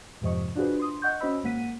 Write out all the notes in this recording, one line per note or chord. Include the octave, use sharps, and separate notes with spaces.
F2 G#2 C3 F3 D#5 C#6
D4 F4 F#4 G#4 B4 C5
C6 D#6
D#5 F#5 C#6 G6
C#4 F#4 C5 D#5 B5 E6
G#1 A#3 F#5 B6 D#7